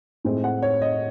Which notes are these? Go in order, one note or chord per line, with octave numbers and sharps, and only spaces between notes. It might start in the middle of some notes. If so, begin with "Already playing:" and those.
A2 G#3 C4
F#5
C#5
D#5